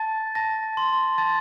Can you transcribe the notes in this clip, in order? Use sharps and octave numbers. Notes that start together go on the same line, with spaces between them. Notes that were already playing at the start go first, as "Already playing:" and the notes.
Already playing: A5 A6
A5 A#6
C6
A5 A6